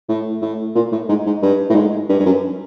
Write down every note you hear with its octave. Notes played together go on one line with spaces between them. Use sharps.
A2
A2
A#2
A2
G#2
G#2
G2
A2
G#2
G2
G2
F#2